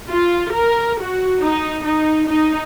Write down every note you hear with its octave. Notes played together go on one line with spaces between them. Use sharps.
F4
A#4
F#4
D#4
D#4
D#4